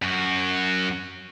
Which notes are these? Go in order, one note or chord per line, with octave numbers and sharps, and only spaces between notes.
F#2 F#4